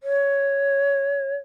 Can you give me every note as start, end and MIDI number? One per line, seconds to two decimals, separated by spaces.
0.03 1.35 73